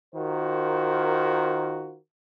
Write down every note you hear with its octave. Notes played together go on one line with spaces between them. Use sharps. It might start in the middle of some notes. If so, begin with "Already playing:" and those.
D#3 F4 F#4 A#4 C5